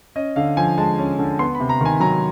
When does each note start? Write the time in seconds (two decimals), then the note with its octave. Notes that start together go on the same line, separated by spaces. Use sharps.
0.16 C#4 D#5
0.36 D3 F5
0.57 F3 G#5
0.78 G#3 A5
0.98 C#4
1.19 D3
1.39 B3 C6
1.55 B5
1.60 C3
1.69 A#5
1.81 D#3 G#5
2.00 F#3 A#5